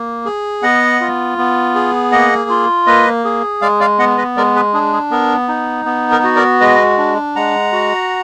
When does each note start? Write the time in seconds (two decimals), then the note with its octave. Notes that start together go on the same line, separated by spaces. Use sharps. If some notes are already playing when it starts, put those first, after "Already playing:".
Already playing: A#3
0.25 G#4
0.63 B3 D#5 F#5
1.01 F4
1.38 B3
1.75 G#4
2.12 A#3 D#5 F#5
2.50 F4
2.86 A#3 B4 D#5
3.25 G#4
3.62 G#3 D5 F5
3.80 D5 F5
3.99 B3 D#5 F#5
4.18 B4 D#5
4.37 G#3 A#4 D5
4.55 G#4 B4
4.74 D4 G#4
4.93 G#4
5.11 B3 A#4
5.48 D#4
5.85 B3
6.11 A#4
6.24 F#4
6.36 A#4 D5
6.60 G#3 B4 D#5
6.98 D4
7.36 G#3 F#5 A#5
7.72 F#4